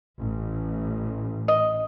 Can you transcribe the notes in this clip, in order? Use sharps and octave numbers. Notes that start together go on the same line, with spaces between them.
A1
D#5